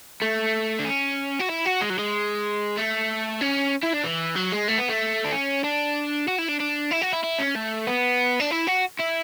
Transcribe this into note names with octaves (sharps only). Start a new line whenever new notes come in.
A3
D4
C#4
F#4
E4
F#4
G#3
F#3
G#3
A3
C#4
E4
D4
E3
F#3
G#3
A3
B3
A3
D4
C#4
D4
F#4
E4
D4
D4
E4
F#4
E4
E4
C#4
A3
B3
D4
E4
F#4
E4